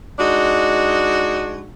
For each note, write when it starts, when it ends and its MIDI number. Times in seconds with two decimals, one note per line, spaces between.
0.19 1.72 56
0.19 1.72 62
0.19 1.72 63
0.19 1.72 66